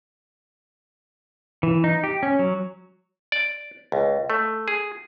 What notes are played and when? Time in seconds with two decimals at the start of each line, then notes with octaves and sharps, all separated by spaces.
1.63 E3
1.84 D#4
2.04 G4
2.23 C#4
2.39 F#3
3.32 D5
3.92 C#2
4.30 A3
4.68 G#4